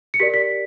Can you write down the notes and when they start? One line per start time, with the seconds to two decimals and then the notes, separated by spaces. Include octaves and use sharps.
0.14 C#7
0.20 G4 A#4 D5 B6
0.34 B6